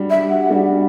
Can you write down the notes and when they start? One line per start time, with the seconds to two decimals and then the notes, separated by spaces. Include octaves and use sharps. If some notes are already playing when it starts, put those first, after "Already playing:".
Already playing: G3 D4 F#4
0.10 E5
0.29 F#5
0.50 G3 D4 F#4